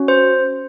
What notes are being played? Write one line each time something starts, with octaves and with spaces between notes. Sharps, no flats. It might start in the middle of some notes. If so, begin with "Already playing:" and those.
Already playing: C#4 F#4
C5